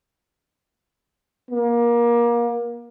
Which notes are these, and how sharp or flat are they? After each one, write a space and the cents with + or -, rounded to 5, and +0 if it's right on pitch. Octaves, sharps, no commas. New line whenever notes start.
A#3 +25